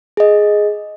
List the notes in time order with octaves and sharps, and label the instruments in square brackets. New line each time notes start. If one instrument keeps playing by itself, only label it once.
[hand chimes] G#4 D#5